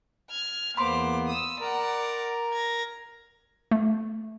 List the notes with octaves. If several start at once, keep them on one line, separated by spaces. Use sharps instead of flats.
F6 G#6
E2 A#3 B3 C5 B5 C6 D6
D#6 E6
A#4 D5 F#5 A#5
G#6 A#6
A3